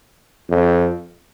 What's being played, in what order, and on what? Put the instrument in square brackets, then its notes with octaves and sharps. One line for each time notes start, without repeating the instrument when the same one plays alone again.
[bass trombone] F2